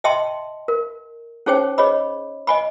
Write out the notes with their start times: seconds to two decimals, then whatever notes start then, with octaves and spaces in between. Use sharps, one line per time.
0.04 D#5 E5 G5 A5 C6
0.68 A#4
1.46 C#4 D#4 G#4 C5 C#5 G5
1.78 G#4 C#5 D#5 B5
2.47 D#5 G#5 B5